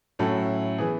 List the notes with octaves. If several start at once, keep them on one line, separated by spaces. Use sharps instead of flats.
A2 F#3 C#4 E4 A4
E3 B3 G#4